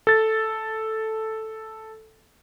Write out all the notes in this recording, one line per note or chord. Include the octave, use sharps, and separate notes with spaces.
A4 A6